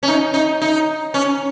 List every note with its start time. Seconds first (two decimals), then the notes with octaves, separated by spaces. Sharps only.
0.03 C#4
0.08 D#4
0.34 D#4
0.62 D#4
1.14 C#4